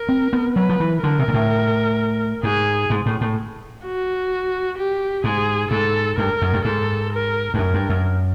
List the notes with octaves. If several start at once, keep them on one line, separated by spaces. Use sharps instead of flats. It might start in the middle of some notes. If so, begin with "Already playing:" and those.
Already playing: A#4
C4
B3
F#3 B4
F3
E3
D3 A#4
C3
A#2
A2
G#2 G#4
G#2
A2
A2
F#4
G4
G#2 G#4
G#2 A4
G2 A#4
F#2
G2
G#2 A4
A#4
G2
F#2 A#4
G2
F#2